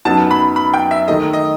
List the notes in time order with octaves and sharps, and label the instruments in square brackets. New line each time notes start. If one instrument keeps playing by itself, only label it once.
[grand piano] F#2 F#3 B3 D#4 [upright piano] A5
[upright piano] B5
B5
G5
E5
[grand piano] D#3 A3 D#4 A4 [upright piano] D#5
[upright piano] D#5